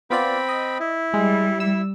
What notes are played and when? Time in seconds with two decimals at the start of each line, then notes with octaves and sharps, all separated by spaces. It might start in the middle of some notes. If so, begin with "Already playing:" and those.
0.10 B3 C4 F4 D5 G5 B5
0.49 D#5
0.80 E4
1.14 G3 G#3
1.60 E4 E6